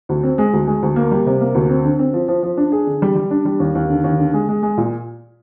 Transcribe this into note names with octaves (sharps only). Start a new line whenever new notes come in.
D2
C4
G#3
D2
G#3
D2
A#3
G3
C3
A#3
D2
C4
D3
C4
F3
F3
F3
D4
G#4
D3
G3
G3
D4
G3
D#2
D#2
D3
D#2
D3
G#3
G#3
G#3
A#2